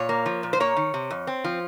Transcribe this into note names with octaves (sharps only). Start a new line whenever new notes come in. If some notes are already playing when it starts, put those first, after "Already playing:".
Already playing: A#2 C#5
A#3
F3
A#2
C5
A#3 C#5
D#3
C3
F2
C4
F3